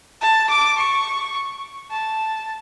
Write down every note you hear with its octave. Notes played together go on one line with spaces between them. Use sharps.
A5
D6
C#6
A5